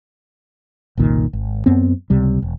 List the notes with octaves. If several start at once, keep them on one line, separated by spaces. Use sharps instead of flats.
F#1 C2 A#2 D#3
G#1
F#2 B3 C4
C#2 C3 G3
E1